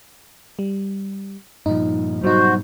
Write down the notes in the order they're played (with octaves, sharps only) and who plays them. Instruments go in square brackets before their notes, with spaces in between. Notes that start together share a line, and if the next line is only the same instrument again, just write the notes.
[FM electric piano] G3
[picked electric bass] G2 A#2 F3 [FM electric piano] D#4
[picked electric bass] G#2 B2 G3 [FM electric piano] F#3 D#4 [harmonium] F#4 C5